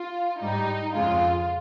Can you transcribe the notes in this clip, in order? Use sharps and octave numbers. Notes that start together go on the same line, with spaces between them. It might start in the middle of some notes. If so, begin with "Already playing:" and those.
Already playing: F4
G#2 G3 D#4
F2 C#3 G#3 F4